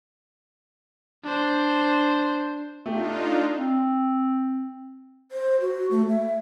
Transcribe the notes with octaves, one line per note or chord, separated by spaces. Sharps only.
D4 C5
A3 D4 D#4 F4 G4
C4
C5
F#4
A3
E5